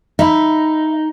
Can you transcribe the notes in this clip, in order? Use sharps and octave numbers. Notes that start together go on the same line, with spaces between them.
D#4 E5 B5